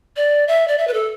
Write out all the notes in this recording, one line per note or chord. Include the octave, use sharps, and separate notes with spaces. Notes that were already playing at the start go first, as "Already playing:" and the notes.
D5
E5
D5
E5
B4
A4